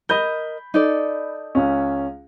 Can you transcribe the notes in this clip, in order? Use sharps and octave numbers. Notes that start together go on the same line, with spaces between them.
A#4 D#5 B5 G6 G7
D#4 A4 D5
C#2 C#4